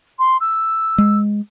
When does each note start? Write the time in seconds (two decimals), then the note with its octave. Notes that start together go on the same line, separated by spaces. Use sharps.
0.18 C6
0.40 E6
0.98 G#3